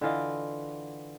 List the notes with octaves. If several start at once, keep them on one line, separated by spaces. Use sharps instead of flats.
D3 E3 F4 D#5